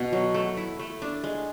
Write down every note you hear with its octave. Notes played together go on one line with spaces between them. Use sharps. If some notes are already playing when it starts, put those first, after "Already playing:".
Already playing: B2
F#3
A3
E4
A3
D4
G#3